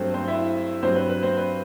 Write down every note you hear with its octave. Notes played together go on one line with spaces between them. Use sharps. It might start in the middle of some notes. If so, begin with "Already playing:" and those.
Already playing: G2 F#3 A3 C4 C5
C4 C5
E4 E5
G2 F#3 C4 C5
B4
B4
C4 C5
B4